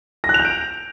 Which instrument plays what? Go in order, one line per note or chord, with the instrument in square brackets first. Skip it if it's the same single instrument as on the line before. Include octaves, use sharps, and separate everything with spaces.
[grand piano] A#6
F#6
F7
G6
D7